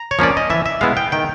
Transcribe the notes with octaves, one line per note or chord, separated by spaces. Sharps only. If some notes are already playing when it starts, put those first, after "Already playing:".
Already playing: A#5
C#5
F3 A#3 C#4 D5
D#5
E3 E5
E5
G#3 B3 E4 F5
G5
D#3 G5